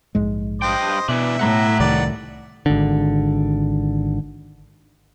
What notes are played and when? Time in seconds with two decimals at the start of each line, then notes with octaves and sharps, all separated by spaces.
0.15 A#1 G#2 G#3
0.62 G2 C5 D#5 G5
1.08 B2 E3 D4 E5
1.40 A2 F#5 A#5
1.80 C2 C3 D#3 D5
2.66 G#1 D3